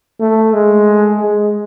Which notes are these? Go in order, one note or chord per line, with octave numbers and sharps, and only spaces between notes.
A3
G#3
G#3